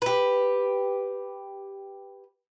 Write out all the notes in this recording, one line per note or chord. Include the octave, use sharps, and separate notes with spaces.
G4 B4